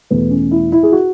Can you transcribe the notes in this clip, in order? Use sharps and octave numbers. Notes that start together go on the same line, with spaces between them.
E2 B2 A3 B3
C#4
E4
E4
G#4
F#4